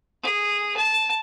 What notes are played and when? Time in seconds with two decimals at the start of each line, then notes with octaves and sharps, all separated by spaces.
0.23 G#4
0.77 A5